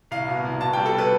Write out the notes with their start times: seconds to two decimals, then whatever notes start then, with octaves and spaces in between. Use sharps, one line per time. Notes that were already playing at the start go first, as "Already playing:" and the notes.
0.11 C2 F5
0.28 B2
0.45 C2
0.61 B2 A5
0.73 G5
0.77 G3
0.86 A4
0.98 B4